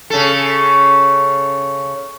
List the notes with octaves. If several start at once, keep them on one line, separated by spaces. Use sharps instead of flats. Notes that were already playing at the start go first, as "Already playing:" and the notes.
C#3 A4